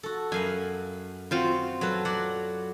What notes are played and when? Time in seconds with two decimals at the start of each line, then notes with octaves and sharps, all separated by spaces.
0.03 F#4 A4
0.32 F#2 F5 G#5 B5
1.31 C4 F4 F#4
1.81 F#3 A4 B4
2.05 F#3 D5 F#5